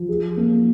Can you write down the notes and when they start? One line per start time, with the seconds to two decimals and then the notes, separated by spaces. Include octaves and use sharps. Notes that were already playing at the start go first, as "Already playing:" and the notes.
Already playing: F3
0.09 G#4
0.37 A#3